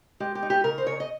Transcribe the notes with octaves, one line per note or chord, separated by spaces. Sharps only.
G#3 G4
G4
D#4
G4
C#3 A#4
C5
C#3 C#5
D#5